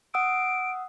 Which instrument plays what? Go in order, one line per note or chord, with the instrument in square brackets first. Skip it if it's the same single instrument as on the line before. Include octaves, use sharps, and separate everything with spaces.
[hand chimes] F#5 D#6 E6 [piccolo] D7